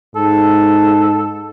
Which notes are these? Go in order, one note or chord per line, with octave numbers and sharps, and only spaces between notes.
G#2 A4